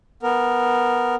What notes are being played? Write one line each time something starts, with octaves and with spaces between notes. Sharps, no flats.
B3 A#4